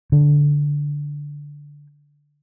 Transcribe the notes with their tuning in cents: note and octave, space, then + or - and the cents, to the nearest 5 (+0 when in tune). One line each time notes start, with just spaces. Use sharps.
D3 -10